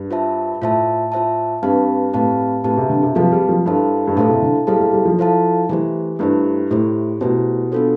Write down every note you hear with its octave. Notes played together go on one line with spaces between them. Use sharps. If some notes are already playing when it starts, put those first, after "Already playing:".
Already playing: G2
F4 C5 E5 A5
A2 F4 C5 E5 A5
F4 C5 E5 A5
G2 C4 G4 B4 F5 A5
A2 C4 G4 B4 F5 A5
A2 C4 G4 B4 F5 A5
C3
D3
C3
F3 C4 G4 B4 F5 A5
G3
F3
G2 E4 A4 C5 F5 A5
G2
A2 E4 A4 C5 F5 A5
C3
D3
G3 E4 A4 C5 F5 A5
G3
G3
F3
E4 A4 C5 F5 A5
E3 A3 E4 G4 C5
G2 A3 E4 G4 C5
A2 A3 E4 G4 C5
B2 A3 E4 G4 C5
B3 D4 F4 A4 C5